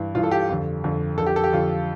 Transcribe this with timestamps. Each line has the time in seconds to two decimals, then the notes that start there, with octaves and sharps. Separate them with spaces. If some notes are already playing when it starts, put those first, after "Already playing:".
Already playing: G2 E3
0.15 G2 E3 F4
0.23 A4
0.31 G4
0.49 F2 D3
0.84 F2 D3
1.18 F2 D3 A4
1.26 G4
1.36 A4
1.44 G4
1.53 F2 D3 F4